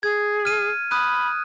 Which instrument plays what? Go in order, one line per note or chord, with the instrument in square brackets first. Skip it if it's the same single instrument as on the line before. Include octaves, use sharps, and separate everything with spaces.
[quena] G#4 [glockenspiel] G#6
[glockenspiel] F6 D#7
[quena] B5 [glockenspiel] D#6 F#6 D#7